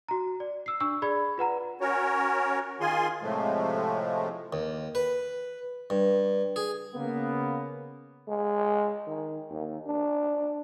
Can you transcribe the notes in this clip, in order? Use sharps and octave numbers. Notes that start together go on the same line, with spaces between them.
F#4 A#5
D5
E6 C7
D4 C#6 E6
G#4 D5 B5 G#6
F4 B4 F#5 A#5
C#4 F#4 A#4 C#5
D#3 F4 G#4 G#5 C6
A2 C3 F3 G#3 A3
D#2
B4
G2
G#4
C#3 A#3 B3
G#3
D#3
D#2
D4